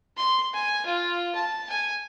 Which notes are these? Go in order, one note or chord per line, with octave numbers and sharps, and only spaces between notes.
C6
G#5
F4
A5
G#5